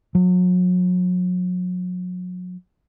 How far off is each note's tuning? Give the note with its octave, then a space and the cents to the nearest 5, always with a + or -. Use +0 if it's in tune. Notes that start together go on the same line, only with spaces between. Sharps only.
F#3 -35